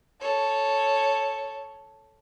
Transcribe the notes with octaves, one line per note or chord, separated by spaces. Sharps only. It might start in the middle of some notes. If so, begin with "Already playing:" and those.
A4 C#5